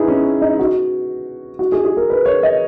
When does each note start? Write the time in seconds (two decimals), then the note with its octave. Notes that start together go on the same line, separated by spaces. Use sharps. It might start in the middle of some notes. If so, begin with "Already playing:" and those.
Already playing: D#4 E4 G#4 B4
0.08 C#4
0.42 D#4
0.59 F#4
1.59 F#4
1.72 G#4
1.85 G#4
1.97 A#4
2.10 B4
2.26 C#5
2.43 D#5